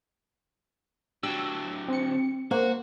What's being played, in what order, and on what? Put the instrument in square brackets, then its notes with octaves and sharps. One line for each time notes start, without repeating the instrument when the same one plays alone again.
[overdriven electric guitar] D3 F#3 [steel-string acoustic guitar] G4 [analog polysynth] E6
[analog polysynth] C4 C#7
[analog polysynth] A#3 [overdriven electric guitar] F#4 [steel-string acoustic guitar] C5